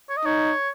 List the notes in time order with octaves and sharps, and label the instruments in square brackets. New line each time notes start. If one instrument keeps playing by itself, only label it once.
[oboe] C#5
D#5
[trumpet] D#4 [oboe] C#5